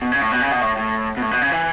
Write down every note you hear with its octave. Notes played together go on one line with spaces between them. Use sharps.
B2
C#3
A2
B2
C#3
B2
A2
A2
B2
A2
B2
C#3
E3